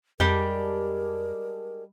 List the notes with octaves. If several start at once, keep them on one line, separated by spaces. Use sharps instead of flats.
F2 G3 G#3 D4 G4 A#4 G5